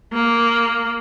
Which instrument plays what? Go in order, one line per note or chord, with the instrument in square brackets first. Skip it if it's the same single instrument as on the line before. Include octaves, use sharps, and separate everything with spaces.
[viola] A#3